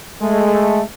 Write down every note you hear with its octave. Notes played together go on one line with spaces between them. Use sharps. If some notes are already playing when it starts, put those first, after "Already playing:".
G#3 A3